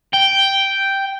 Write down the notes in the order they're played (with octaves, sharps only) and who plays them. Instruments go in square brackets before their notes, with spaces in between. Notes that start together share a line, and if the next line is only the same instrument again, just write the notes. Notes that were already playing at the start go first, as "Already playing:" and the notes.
[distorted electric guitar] G5